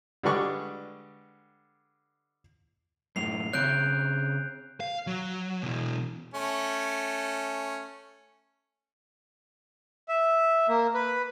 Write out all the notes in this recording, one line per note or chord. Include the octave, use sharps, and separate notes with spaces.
D3 G3 G#3 B4 D5 C#6
F#2 A2 C7 F7
C#3 C4 C#5 F#6 G6 D7
F5
F#3
B2 E3
A3 C#4
E5
A#3
B4